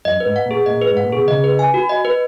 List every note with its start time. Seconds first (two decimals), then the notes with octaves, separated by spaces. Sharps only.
0.05 F#2 D#5
0.20 B4
0.26 G#2
0.36 F#5
0.46 A#2
0.51 G#4
0.66 A#2 D#5
0.81 B4
0.91 G#2
0.97 F#5
1.04 A#2
1.13 B2 G#4
1.28 C#3 D#5
1.44 B4
1.59 G#5
1.74 F#4
1.89 D#5
2.05 B4